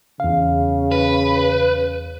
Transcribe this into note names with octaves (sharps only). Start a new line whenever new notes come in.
E2 C#3 F5
B4